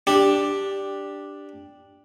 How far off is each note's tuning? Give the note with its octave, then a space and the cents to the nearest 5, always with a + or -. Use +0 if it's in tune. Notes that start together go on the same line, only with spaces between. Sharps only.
D4 +0 G4 +0